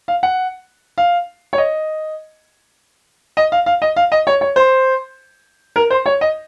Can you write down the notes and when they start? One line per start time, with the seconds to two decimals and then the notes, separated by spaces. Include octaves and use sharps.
0.08 F5
0.23 F#5
0.98 F5
1.53 C#5
1.58 D#5
3.37 D#5
3.52 F5
3.66 F5
3.82 D#5
3.96 F5
4.12 D#5
4.27 C#5
4.41 C#5
4.56 C5
5.76 A#4
5.90 C5
6.06 C#5
6.21 D#5